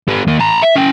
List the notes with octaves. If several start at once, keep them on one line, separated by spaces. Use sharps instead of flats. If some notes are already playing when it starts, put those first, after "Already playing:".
G3 B3
D#3 A#3
A5 A#5
E5
C#4 G5